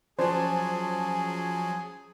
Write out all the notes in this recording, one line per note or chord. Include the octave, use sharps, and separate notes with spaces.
F3 F#3 C#4 G#4 C5 D5 G#5 A5